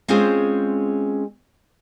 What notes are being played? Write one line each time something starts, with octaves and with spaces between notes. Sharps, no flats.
G#3 C4 C#4 F4 G#4 C5